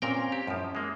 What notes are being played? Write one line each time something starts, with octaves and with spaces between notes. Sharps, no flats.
A#2 C4 C#4 A#4 G5
G4
F#2 F3 C#4 E4
G#3 A#3